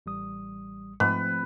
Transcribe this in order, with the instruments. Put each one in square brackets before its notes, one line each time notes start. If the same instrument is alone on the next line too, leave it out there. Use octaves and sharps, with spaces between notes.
[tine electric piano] A1 G3 D#6
[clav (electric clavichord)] G#2 [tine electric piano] F3 A3 C4 [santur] B4